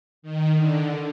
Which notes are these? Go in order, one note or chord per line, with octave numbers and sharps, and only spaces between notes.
D#3
D3